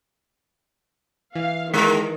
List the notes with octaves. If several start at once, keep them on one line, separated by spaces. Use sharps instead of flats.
E3 F5
D#3 G#3 A#4